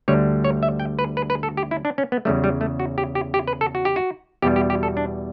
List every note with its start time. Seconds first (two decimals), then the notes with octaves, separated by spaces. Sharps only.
0.08 D2 D3 G3 C#5
0.44 C#5
0.63 E5
0.80 G5
0.99 B4
1.17 B4
1.30 B4
1.43 A4
1.57 G4
1.71 E4
1.85 D4
1.98 C#4
2.12 B3
2.25 E2 C#3 G3 A3
2.44 G3
2.61 A3
2.80 F#4
2.98 G4
3.15 G4
3.34 G4
3.48 B4
3.61 A4
3.75 F#4
3.85 G4
3.96 F#4
4.42 E2 B2 G3 G4
4.56 G4
4.70 G4
4.83 A4
4.97 D4